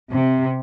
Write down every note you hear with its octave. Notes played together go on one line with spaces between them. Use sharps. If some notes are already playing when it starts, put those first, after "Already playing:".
C3